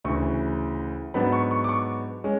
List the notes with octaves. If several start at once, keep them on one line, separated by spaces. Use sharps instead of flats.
D2 C#3 E3 C#6
G#2 F#3 B3 D4 B5
C#6
C#6
D6
C#6
G#3 C#4